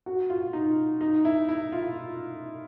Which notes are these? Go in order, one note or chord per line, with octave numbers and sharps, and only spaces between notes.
F#4
F4
D#4
D#4
E4
E4
F4